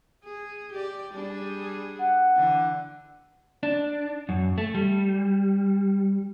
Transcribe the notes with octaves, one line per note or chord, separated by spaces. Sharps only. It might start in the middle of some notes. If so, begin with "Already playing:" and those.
G#4
G4 D5
G3 D4 G#4
F#5
D3 E3 D4
D4
F#2
A3
G3